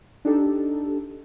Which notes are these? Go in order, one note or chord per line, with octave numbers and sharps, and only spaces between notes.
D4 D#4 G4 A4